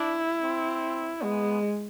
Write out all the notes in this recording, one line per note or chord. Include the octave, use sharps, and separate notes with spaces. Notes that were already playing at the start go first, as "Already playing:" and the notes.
Already playing: D4 E4
C4
G#3 B3